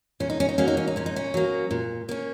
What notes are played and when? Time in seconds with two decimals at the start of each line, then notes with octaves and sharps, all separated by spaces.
0.20 A#2 C#4
0.30 D#4
0.40 C#4
0.49 D#4
0.58 F#3 A#3 C#4
0.68 D#4
0.77 C#4
0.88 D#4
0.96 A#2 C#4
1.06 D#4
1.16 C#4
1.34 F#3 A#3
1.71 A#2
2.09 A#3 C#4